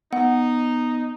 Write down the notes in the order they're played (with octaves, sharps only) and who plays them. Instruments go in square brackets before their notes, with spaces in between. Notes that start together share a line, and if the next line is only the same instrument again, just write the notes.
[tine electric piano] B3 [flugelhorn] D#4 [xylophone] F#5